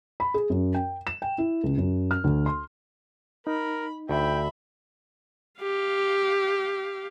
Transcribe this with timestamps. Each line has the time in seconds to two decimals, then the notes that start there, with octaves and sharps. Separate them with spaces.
0.20 B5
0.34 G#4
0.50 F#2
0.74 G5
1.07 E7
1.22 G5
1.38 E4
1.63 C#2
1.78 F#2
2.11 F6
2.24 D2
2.46 C6
3.47 D#4 A#4 B5
4.09 D2 E5 G5 B5
5.61 G4 F5